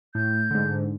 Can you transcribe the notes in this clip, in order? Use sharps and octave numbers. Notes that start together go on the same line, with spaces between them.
A2 G6
G#2 D3